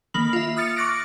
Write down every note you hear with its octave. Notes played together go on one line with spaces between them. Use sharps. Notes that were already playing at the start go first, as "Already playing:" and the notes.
D#3 A#3 B5 F#7
F4 E5
D#6 F6 A6 C#7
C#6 D6 F#6 A#6 D7